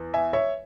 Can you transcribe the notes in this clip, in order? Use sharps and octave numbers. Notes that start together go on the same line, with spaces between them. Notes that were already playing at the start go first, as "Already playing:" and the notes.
Already playing: E2
E5 G#5
C#5 E5